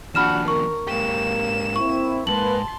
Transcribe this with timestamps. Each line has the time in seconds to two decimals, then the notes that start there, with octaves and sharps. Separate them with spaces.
0.15 D#2 F3 D4 F#4 B5 F6 E7
0.48 A#4 C#6
0.87 G#2 A#3 G4 E7
1.76 C4 E4 C#6
2.27 F2 G#2 A#3 B4 A5 C6 F#7